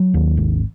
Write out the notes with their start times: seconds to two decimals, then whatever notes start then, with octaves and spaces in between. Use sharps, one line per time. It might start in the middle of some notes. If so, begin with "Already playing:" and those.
Already playing: F#3
0.14 D#2
0.37 G#1